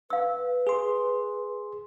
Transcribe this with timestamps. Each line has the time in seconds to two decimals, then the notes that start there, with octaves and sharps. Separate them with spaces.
0.10 B4 F5 E6
0.67 G#4 C6